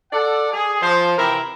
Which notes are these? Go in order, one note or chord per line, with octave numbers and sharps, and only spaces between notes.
A4 D5 F#5
G#4
F3 C5
C3 E3 E4 A#4